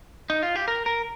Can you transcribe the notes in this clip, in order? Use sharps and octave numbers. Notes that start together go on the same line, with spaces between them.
D#4
F4
G4
A#4
A#4